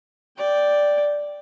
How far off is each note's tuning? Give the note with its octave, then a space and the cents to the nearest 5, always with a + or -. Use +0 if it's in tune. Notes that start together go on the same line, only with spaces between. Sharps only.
D5 +0 G5 +0